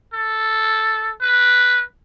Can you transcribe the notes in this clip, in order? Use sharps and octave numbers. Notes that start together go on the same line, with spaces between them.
A4
B4